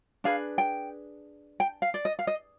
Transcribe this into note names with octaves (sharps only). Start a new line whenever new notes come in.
D4 G#4 B4 F5
G5
G5
F5
D5
D#5
F5
D#5